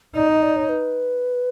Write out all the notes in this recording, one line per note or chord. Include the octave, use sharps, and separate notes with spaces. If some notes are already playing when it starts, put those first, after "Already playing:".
D#4 D5
D#5
D5
C#5
B4